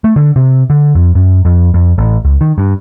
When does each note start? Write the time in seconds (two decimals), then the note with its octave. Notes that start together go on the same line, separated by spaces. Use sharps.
0.04 A3
0.16 D3
0.36 C3
0.70 D3
0.95 F2
1.15 F#2
1.45 F2
1.74 F2
1.98 A1
2.25 C#2
2.41 D#3
2.58 G2